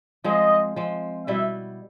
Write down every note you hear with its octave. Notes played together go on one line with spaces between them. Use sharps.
F3 G#3 C4 D#5
F3 G#3 C4
B2 G3 B3 E4 E5